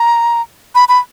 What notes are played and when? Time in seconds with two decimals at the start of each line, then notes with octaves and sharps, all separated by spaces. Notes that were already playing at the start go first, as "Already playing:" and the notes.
Already playing: A#5
0.75 B5
0.89 B5